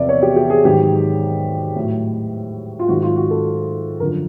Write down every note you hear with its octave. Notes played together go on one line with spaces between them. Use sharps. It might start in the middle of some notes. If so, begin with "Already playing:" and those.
Already playing: E2 C3 F3 D5 E5
C#5
G4
G4
G#4
G#2 D#3 F#3 G4
A2 F#3
F4
G#2 D#3 F#3 F#4
F4
F#4
A4
F#2 D3 F3 A#4